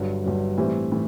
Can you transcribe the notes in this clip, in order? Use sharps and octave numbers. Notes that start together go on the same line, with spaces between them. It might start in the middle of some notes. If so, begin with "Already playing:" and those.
Already playing: G1 G2 F#3
G1 G2 F#3
A2 E3 G3 C4
A2 E3